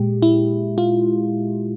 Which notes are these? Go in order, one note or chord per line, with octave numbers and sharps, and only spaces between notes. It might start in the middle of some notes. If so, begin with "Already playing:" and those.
Already playing: A#2 G#3 G4
E4
F4